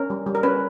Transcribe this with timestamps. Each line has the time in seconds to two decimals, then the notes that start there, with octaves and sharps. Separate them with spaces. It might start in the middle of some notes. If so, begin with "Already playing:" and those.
Already playing: C#4 A#4
0.10 G3
0.26 G3
0.35 A#4
0.43 C#4 B4